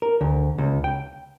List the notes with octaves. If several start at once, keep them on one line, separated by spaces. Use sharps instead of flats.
A#4
D2
C#2
G5